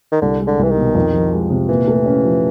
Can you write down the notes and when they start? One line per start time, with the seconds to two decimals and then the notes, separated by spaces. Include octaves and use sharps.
0.12 D#3
0.21 C2 D3
0.40 G#3
0.47 D3
0.59 C2 E3
0.71 D#3
0.77 B2
0.95 F2
1.13 F3
1.31 G#3
1.50 C3
1.69 A#2 E3
1.88 A3
2.06 C#4
2.24 F3